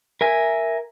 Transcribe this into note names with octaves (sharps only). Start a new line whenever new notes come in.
A#4 E5 G#5